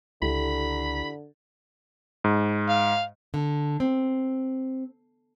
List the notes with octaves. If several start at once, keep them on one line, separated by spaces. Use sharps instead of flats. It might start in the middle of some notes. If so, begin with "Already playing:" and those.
C#2 D3 E4 G4 A4 B5
G#2
F5
D3
C4